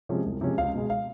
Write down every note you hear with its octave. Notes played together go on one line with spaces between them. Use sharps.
C3 F3 G#3 C#4
C2
C3 F3 G#3 C#4
C#2 F5
B2 G#3
F5